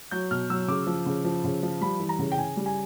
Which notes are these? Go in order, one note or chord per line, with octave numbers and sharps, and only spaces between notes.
F#3 G6
B2 F6
F#3 E6
C#3 D6
F3
C#3
F3
C#3
F3
G3 B5
E3
A#5
C#3
G5
C#3 G#5
G3
G#5